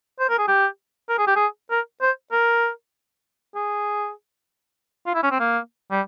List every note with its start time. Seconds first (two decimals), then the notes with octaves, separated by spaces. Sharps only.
0.19 C5
0.29 A#4
0.38 G#4
0.48 G4
1.09 A#4
1.18 G#4
1.27 G4
1.36 G#4
1.71 A#4
2.01 C5
2.32 A#4
3.55 G#4
5.06 F4
5.14 E4
5.23 C#4
5.31 C4
5.40 A#3
5.91 G3